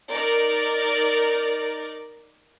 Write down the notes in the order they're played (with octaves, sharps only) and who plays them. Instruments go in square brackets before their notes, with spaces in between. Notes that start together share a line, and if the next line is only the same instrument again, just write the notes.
[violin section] D#4 A#4 D5